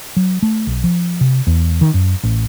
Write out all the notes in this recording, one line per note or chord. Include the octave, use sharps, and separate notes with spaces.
F#3
A3
B1
F3
C3
E2
D#3
F#2
A1